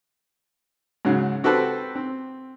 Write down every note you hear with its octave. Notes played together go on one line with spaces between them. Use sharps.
G#2 C#3 F#3
C4 F#4 G4 A4 B4 C5
C4